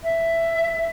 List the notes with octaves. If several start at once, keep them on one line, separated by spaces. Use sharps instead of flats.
E5